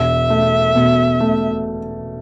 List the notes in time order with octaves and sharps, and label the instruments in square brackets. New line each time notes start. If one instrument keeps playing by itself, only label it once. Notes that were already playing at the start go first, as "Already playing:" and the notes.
Already playing: [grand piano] E1 [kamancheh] E5
[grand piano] A3
B2
A3